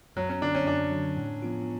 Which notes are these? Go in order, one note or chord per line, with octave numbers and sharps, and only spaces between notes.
F#2 F#3
C#4
D3 F#3 D4
C#4
F#2 D4
D3 F#3
A2
F3 B3 F4